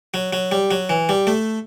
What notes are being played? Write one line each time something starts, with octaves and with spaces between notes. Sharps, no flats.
F#3
F#3
G3
F#3
E3
G3
A3